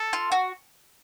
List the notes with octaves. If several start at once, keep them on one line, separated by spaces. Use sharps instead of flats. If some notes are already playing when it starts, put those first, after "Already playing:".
Already playing: A4
F4
F#4